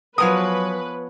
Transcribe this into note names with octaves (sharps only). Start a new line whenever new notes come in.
F3 F#3 B3 A#4 B4 C#5 G#5 D#6